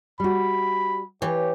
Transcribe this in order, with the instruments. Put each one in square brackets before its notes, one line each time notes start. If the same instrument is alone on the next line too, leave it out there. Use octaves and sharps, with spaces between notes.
[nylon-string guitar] G3 F#4 [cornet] B5
[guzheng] E3 [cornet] G4 [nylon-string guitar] C#5